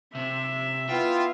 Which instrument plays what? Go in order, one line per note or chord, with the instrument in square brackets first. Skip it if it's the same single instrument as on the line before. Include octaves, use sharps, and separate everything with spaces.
[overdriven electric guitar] C3 [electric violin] E5
[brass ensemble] B3 E4 F4 [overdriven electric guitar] G5